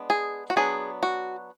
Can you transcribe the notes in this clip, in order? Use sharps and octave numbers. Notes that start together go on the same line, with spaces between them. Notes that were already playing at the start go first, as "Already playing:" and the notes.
Already playing: G#3 B3 D4
G#4
F#4
F#3 B3 D4 G#4
F#4